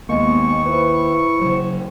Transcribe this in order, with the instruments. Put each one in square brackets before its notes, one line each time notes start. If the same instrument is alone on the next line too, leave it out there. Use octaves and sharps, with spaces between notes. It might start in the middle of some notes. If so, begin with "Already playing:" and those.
[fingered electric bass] D#2 [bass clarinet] G#3 [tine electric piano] A#3 B3 [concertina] C#6
[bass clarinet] E4 [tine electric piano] B4 C5
[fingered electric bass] C#3 F#3 [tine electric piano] C5